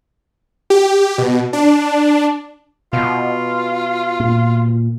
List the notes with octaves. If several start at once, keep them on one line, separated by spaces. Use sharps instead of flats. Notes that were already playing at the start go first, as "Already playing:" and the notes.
G4
B2
D4
B2 F4
A#2